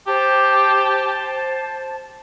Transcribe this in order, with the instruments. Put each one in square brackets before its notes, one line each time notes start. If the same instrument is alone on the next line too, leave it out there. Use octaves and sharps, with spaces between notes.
[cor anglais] G4 [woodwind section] C5 A5